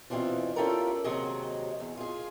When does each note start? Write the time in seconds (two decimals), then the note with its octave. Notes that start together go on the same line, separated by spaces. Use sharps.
0.10 B2 E3 C4 D4 F4
0.56 C#4 E4 F4 G4 A4 A#4
1.04 D#2 C3 F#3 F#4 G#4 D#5
1.80 E2
1.97 F4 G#4